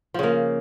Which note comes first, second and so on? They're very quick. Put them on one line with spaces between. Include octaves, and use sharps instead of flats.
F3 C#3 A#3